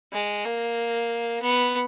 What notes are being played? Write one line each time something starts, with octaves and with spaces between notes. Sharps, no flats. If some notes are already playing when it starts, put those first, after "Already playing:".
G#3
A#3
B3